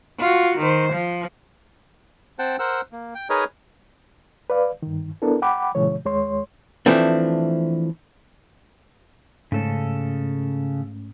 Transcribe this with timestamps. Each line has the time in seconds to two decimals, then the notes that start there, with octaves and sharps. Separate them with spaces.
0.20 F4 F#4
0.58 D#3 C5
0.93 F3
2.39 C4 C5 F#5 G5 A5
2.59 A#4 C5 F#5 E6
2.92 A#3
3.15 G5
3.30 D#4 G#4 A#4 B4 C#5 D#5
4.50 B4 D5 F5
4.83 G2 D#3
5.22 B3 D4 E4 A4 A#4
5.42 F#5 G5 B5 D6
5.75 A#2 C#3 E3 G#3 C#5
6.05 D#2 G#3 C#5 C6
6.86 E3 F3 A3 C4 D4
9.52 G#2 C#3 A3 C#4 A4